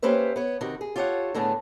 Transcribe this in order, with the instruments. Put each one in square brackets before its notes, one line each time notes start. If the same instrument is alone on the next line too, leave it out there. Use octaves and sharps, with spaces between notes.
[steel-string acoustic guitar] A#3 C#4 G4 B4 C5 E5
B3 C#5
C3 D#3 F#4
G#4
F4 G4 A4 C#5 E5 F#5
A2 D3 A3 B3 G#4